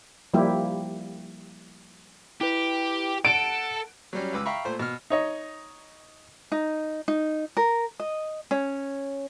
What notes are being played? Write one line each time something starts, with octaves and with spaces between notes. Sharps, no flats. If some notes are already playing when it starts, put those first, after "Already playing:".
F3 G3 A#3 E4 G4
E4 G4 B4
A4 F#5 D7
F#3 G3 C#4
C#2 B4 D6 E6
E5 F5 G5 A#5 B5 C#6
A#2 A3 C5
B2 F6
D#4 C#5 D#5
D#4
D#4
A#4
D#5
C#4